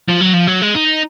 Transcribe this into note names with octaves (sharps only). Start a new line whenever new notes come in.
F3
F#3
F3
F#3
G#3
D#4